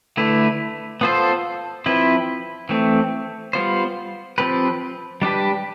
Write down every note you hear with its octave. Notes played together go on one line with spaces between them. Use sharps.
D3 A3 E4 B4
B3 F4 A4 C5
F3 C4 E4 B4
E3 A3 C4
G3 B3 F4 C5
F3 C4 G4 B4
G3 D4 G4 B4